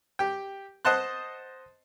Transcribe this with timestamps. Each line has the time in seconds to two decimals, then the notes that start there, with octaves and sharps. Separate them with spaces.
0.19 G4 G5
0.85 C5 D#5 F#5 A5 C6 F#6